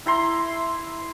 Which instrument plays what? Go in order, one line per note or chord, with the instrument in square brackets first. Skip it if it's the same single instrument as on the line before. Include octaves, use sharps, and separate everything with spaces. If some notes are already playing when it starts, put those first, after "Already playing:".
[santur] E4 A#5 C6